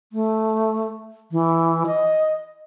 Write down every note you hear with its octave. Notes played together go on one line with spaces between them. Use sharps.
A3
E3
D#5